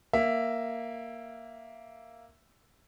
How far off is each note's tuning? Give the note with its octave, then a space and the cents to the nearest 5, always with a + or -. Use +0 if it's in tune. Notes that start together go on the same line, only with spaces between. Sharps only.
A#3 +0 E5 +5